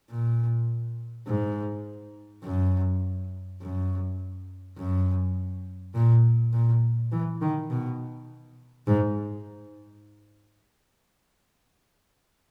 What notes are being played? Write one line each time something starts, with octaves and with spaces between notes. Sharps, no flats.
A#2
G#2
F#2
F#2
F#2
A#2
A#2
E3
D#3
B2
G#2